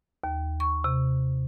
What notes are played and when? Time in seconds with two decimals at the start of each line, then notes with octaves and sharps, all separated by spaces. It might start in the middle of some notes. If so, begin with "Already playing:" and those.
0.24 D#2
0.60 C#6
0.84 C3